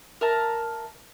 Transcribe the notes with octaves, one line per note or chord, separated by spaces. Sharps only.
A#4 E5 A5